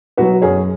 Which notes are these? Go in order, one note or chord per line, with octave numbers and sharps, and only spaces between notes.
B2 F#3 F#4 B4
F#2 G#4 C#5